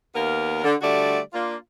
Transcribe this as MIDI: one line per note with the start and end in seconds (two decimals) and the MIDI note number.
0.14 0.60 39
0.14 0.60 58
0.14 0.60 59
0.14 0.60 70
0.64 0.75 50
0.81 1.18 50
0.81 1.18 55
0.81 1.18 57
0.81 1.18 66
0.81 1.18 74
1.33 1.55 58
1.33 1.55 62
1.33 1.55 65